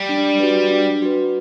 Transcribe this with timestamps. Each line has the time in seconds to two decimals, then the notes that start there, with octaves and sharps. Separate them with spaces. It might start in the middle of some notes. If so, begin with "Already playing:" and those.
Already playing: G3
0.09 D4
0.40 F#4 B4
0.71 D4
1.02 F#4 B4